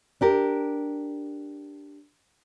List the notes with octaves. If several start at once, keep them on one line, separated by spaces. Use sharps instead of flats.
D4 G4 A#4